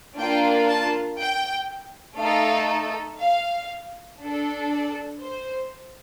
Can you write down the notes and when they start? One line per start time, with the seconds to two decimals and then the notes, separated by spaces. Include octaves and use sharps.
0.19 A#3 D4 F4 G5
0.69 A5
1.20 G5
2.19 A3 D#4 A4 F5
3.20 F5
4.21 D4 A4
4.71 D5
5.21 C5